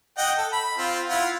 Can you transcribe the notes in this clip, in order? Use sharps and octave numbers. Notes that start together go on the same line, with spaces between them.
D#5 F#5 G5
A4
B5
C4 F4
E4 F4 F#5